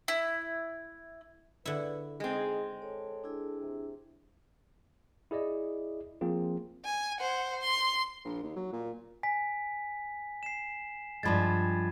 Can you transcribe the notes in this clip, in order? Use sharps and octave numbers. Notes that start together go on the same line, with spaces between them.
E4
D3 E4 B4
G#3 C4 D#4 G#4 D#5
A4 C#5
D4 E4 G#4
C3
E4 G#4 D5 D#5
F3 A#3 C4 F4 G#4
G#5
C5 F#5
C6
A#1
D#2
F#3
A#2
G#5 B6
C7 E7
G2 F3 G#3 B5 G#6 A6